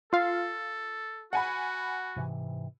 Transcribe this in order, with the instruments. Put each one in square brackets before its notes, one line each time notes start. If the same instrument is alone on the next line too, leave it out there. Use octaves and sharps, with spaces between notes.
[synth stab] F4 F5 [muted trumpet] A4
[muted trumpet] F#4 [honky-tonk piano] F#5 G#5 B5
[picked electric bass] G#2 C3 E3